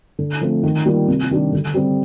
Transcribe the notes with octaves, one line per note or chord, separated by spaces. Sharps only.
D3
F3 A3 C4
D#3
G3 A#3 F4 A#4
C3
D#3 G3 D4
D3
G3 C4